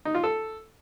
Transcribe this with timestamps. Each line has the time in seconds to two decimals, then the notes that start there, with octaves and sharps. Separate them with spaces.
0.05 D#4
0.15 F4
0.24 A4